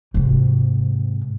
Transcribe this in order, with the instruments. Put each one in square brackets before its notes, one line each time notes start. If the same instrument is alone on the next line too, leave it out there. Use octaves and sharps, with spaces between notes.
[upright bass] G#2 C3